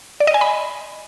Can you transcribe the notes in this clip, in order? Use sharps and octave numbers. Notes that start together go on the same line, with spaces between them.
D5
D#5
G#5
B5